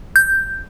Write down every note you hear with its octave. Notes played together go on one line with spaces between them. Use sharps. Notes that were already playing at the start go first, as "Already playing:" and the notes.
G6